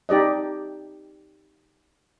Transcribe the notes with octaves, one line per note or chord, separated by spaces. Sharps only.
D#4 G4 D5 D#5